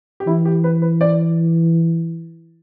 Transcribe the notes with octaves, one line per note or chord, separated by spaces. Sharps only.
G4
E3 E4
G4
B4
B4
D5